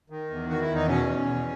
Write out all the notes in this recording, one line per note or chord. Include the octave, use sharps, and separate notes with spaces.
D#3
E2
D#3 F#4
E4
E2
D#4
B2 C#4
E2
B2